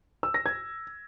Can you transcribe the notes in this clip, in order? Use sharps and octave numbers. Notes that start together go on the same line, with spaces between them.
E6
A#6
G#6